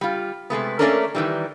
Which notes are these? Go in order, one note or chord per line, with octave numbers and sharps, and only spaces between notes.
G3 F4
C3 G#3 A3 B3
A3 A#3 C#4 D4 A4 A#4
D#3 E3 G3